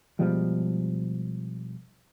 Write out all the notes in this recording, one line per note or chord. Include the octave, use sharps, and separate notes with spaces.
B2 F3 G3 G#3